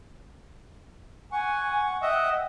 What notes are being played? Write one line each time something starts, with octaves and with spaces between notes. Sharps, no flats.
F#5 G#5 C#6
D#5 E5 F#5 G5